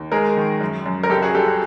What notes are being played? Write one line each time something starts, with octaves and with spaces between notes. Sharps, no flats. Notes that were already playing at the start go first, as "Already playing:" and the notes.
Already playing: D#2
G#3 G#4 A#4
D#3
F#2
F#2
A#4
C#2 G4 A4
F#4 G#4
G3 G4 A4
F#4 G#4